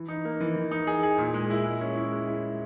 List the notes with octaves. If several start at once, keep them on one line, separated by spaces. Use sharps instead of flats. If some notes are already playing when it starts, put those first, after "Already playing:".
Already playing: E3
D#4
A#3
E3
E3
D#4
G#4
G#4
A#2
G#3
E4
G#3
C#4
E4
G#3
E4